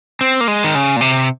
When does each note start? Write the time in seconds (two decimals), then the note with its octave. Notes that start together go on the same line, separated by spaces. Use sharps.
0.21 C4
0.41 A#3
0.48 G#3
0.64 D#3
0.75 C#3
0.96 A#2
1.01 C3